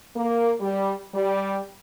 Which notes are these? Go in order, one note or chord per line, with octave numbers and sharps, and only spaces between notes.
A#3
G3
G3